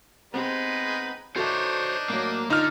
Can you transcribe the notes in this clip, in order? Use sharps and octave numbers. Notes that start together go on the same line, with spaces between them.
G#3 B3 C4 D#4 G4 B4
D4 D#4 F#4 A4 C5 C#5 E5
A2 F#3 A#3
D3 D#4 F4 F6